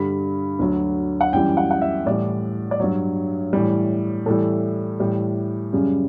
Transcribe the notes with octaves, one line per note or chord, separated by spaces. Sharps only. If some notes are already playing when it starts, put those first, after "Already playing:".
Already playing: G2 D3 G3 B5
D2 D3 F#3
F#5
F#2 E3 G3 G5
F#5
F#5
E5
A2 E3 G3 D5
D5
G2 F#3 C#5
A2 E3 G3
A2 E3 G3 A4
A2 E3 G3 G4
F#2 C#3 G3